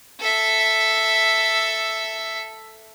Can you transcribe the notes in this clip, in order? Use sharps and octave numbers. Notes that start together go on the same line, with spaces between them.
A4 E5